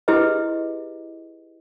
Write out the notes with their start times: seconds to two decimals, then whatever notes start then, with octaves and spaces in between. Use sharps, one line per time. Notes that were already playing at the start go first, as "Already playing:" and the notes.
0.08 E4 G4 G#4 B4 D#5